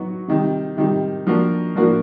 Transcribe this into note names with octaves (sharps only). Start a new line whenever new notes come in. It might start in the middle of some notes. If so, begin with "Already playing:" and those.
Already playing: F#3 B3 D#4 F#4
C3 D#3 G3
C3 D#3 G3
F3 A#3 D4 F#4 A#4
F3 A#3 D4 F#4 A#4